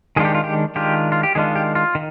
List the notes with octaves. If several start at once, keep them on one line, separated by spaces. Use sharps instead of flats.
D#3 G#3 D4 F4 G#4
G4
F4
G4
D#3 G#3 D4 F4 G4
F4
G4
D#3 G#3 D4 F4 G#4
G4
F4
D#3